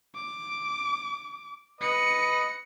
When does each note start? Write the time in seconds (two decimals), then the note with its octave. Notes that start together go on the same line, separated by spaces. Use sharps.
0.15 D6
1.81 B4 D#5 C#7